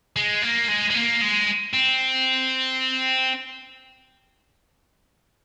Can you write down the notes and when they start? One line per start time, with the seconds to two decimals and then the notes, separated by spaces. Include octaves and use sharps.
0.16 G#3
0.42 A#3
0.68 G#3
0.90 G#3
0.95 A#3
1.21 G#3
1.74 C4